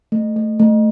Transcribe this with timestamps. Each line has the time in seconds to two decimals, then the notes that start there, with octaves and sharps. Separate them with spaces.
0.12 A3
0.36 A3
0.60 A3